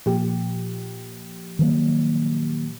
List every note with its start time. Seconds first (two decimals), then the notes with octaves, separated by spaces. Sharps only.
0.06 A#2 F3 G4
1.59 D#3 F#3 A#3